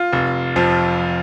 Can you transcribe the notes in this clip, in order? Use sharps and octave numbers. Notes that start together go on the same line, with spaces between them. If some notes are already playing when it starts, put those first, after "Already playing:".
Already playing: F4
F1
F2 F3